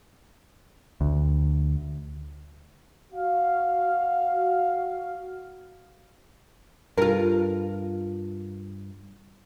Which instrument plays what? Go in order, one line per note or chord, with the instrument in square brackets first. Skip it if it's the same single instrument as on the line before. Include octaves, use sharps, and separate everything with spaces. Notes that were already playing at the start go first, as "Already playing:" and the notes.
[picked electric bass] D2
[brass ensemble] F#4 F5
[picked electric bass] G2 [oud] F4 A#4